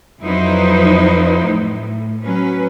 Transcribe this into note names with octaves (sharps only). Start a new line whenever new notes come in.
F2 F#3 D#4 E4 B4 C5
A2
F#3 C#4 B4